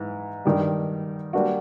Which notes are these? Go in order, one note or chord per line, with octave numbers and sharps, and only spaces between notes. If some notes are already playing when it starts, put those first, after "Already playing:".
Already playing: G#2 E3
G2 D#3 G3
G3 A#3 D4 F#4